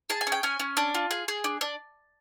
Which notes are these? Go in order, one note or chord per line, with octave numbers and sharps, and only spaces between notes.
G#4 A5
G#5
C#4
G5
C#4 G#5
C#4
D4
F4
G#4
G#4
D4
D4